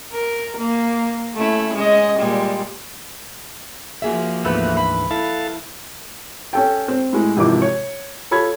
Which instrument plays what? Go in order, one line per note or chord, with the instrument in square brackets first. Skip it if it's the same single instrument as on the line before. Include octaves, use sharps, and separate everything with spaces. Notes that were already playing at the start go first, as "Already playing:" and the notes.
[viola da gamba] A#4
A#3
A3 C#4 E4
G#3 C#4 D#5
A#2 G3 G#3
[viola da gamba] F3 A#3 [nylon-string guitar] F#4 G#4 E5
[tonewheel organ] D2 G#2 E3 [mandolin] A3 B3 B4
[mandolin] B4
[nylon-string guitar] E4 [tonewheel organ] A4 F5 A5
[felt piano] C#4 A4 G5
C4
A2 G#3
G#1 C3 E3 F3 D6
C#5
F4 A4 C#5 B5 G#6